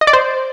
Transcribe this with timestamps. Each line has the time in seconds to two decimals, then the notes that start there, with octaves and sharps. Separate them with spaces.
0.01 D#5
0.07 D5
0.13 C5